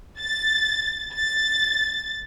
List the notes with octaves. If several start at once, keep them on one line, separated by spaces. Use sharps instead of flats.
A6
A6